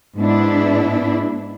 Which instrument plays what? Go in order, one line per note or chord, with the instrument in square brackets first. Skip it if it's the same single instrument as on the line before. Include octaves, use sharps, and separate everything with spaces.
[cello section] G#2 B3 D4 E4